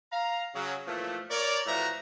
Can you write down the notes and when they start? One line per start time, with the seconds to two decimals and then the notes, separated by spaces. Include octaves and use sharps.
0.11 F5 A#5
0.54 C#3 F#3
0.86 A#2 E3 F3 A3
1.31 A#4 C#5 D5
1.66 A2 E3 F3 F#4 E5 A#5